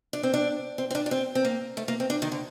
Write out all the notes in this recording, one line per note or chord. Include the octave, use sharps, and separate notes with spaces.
D4
C4
D4
C4
C4
D4
D4
C4
C4
A#3
A3
A#3
C4
D4
D#3
D3